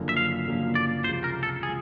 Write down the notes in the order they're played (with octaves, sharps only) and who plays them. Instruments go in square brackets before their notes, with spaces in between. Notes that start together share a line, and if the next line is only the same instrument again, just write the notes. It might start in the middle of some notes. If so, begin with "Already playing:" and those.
Already playing: [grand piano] F#1 F#2 D3 F3 A#3
[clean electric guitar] E5
F5
[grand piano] F#1 F#2 D3 F3 A#3
[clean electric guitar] D5
[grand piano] C#2 C3 F3 G#3 [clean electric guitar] C5
[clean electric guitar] A#4
A4
[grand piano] C3 F3 G#3 [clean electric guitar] G#4